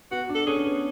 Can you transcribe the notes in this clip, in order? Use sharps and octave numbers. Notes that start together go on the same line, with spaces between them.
B3 F#4
D4
A4
C#4 G#4
B3